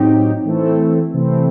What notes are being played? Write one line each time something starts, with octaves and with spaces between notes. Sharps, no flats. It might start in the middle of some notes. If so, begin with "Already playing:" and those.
Already playing: A2 F#3 C4 D#4 G4
E3 A3 C4 E4 A4
C3 E3 A3 C4 E4